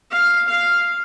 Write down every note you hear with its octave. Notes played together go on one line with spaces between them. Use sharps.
F5
F5